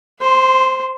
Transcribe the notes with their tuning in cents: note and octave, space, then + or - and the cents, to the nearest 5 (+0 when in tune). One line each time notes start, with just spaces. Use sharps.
C5 +0 C6 -30